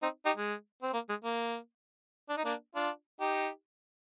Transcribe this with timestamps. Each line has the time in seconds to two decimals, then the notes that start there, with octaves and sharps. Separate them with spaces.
0.02 C4 D#4
0.25 D#4 G4
0.36 G#3
0.82 C4
0.93 A#3
1.09 G#3
1.24 A#3
2.29 D4
2.37 D#4
2.44 A#3 D4
2.75 D4 F4
3.20 D#4 G4